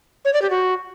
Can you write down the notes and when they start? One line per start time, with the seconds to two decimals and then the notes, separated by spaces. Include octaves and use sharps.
0.25 C#5
0.33 D5
0.42 G4
0.50 F#4